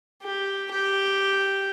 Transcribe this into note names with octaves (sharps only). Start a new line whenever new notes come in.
G4
G4